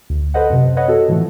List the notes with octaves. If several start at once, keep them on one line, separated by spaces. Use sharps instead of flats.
D2
A4 B4 C5 D#5 F#5
F#2 C3
B4 C#5 D#5 F#5
C4 F#4 A4
A2 E3 F3 A3